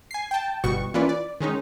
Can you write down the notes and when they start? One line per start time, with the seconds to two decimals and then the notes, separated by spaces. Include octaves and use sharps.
0.11 G#5 C7
0.31 G5 A5
0.64 G1 B2 G3 F#4 C#6
0.94 E3 A#3 C#4 F4 B4 D5
1.09 D5
1.40 D#3 G#3 C#4 D#4